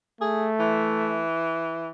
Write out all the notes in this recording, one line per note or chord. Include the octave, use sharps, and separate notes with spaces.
A3 G#4
E3